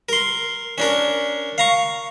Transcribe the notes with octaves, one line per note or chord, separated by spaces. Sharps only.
A#4 C6
C#4 D4 A#4
F5 A#5 C#6